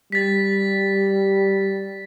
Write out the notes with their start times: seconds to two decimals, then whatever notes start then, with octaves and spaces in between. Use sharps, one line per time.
0.12 G3 A6 B6